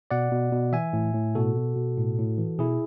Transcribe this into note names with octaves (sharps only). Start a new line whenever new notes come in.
B2 D5 F#5
B2
B2
E3 E5 G#5
A2
A2
B2 F#4 A4
B2
B2
A2
A2
E3
B2 E4 G#4